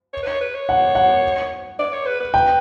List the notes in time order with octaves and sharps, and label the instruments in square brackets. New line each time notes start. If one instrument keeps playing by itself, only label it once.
[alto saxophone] C#5
B4
C#5
B4
C#5
[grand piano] F#5
F#5
[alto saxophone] D5
C#5
B4
B4
[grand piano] G5